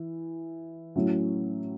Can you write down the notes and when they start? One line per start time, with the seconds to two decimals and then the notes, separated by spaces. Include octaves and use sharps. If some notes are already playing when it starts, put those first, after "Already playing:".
Already playing: E3
0.96 A2 F#3 C#4 E4